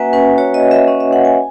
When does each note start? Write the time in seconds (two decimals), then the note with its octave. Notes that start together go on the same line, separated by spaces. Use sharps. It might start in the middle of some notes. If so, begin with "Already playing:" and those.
Already playing: A#3 C#4 F#4 B4 E5 F#5 G#5
0.13 C#4 B4
0.38 F#4 C#5
0.54 D#5
0.63 A#3
0.71 E5
0.88 C#4 D#5
1.00 E5
1.13 C#4 F#5
1.25 G#5